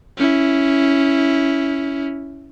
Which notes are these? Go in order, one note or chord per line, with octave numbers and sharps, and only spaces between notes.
C#4 E4